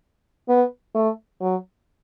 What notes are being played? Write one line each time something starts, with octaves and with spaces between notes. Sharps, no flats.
B3
A3
F#3